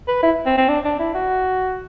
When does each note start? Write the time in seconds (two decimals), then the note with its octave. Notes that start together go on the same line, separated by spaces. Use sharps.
0.08 B4
0.23 E4
0.46 C4
0.57 C4
0.69 D4
0.85 D4
0.99 E4
1.15 F#4